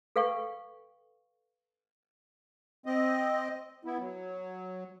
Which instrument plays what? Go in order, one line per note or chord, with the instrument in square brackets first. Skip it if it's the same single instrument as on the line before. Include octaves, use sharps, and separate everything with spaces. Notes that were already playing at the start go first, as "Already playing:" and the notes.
[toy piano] A4 B4 F5 G5 C#6
[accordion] C4 D#5
B3 E4
F#3